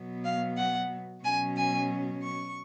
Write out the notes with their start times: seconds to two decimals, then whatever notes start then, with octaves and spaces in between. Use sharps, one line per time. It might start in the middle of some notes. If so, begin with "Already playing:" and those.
Already playing: B2 F#3 B3
0.24 F5
0.57 F#5
1.24 B2 F#3 C#4 G#5
1.57 G#5
2.22 C#6